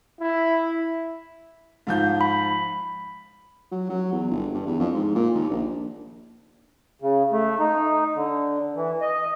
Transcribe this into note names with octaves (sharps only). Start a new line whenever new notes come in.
E4
G#2 F3 G6
B5
F#3
F#3
E2
G1
G2
E2
F2
G#2
A#2
D#2
A#1
C#3
A3
D#4
D3
E3
D#5